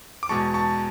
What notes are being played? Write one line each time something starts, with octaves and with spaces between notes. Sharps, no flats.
D6
E2 B2 G#3 A5 C#6
A5 C#6